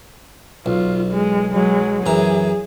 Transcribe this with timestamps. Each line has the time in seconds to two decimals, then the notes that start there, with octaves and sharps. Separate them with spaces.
0.66 B1 F4
1.11 G#3
1.53 F#3 G#3
2.06 F#2 E3 G#4 A#5